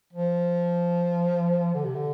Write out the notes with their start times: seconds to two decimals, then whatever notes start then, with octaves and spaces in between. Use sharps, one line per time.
0.13 F3
1.74 D3
1.85 C3
1.95 D3